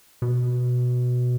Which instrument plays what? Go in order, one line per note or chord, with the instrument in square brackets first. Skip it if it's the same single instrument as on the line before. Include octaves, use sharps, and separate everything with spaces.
[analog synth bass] B2